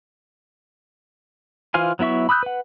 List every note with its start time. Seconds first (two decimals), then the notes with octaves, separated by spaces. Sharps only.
1.74 E3 F4 C5 F5 G#5
1.99 F#3 B3 E4 E5 C#6
2.29 B5 D#6 E6 F#6 G6
2.43 B4 F#5